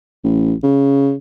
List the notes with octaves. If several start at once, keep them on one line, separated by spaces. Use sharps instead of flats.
A1
C#3